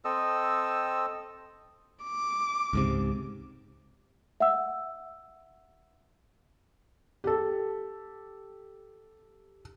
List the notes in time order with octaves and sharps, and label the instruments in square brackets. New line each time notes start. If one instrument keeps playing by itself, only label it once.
[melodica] C4 A4 D#5 E6
[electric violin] D6
[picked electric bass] C#2 G#2 C3
[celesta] E5 F#5 E6
[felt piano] G4 A4